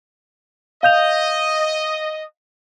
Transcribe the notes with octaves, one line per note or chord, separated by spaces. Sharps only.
D#5 F5 G6 F7